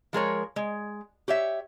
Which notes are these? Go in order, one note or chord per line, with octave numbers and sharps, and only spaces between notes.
F3 G#3 A#4 C#5
G#3
G4 C#5 E5